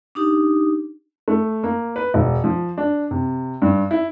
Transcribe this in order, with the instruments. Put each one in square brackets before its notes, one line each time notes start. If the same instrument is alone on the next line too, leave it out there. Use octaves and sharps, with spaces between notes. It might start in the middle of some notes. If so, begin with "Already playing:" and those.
[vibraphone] D4 D#4 G4
[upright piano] A3
A#3
B4
E1
F3
D4
C3
G2
E4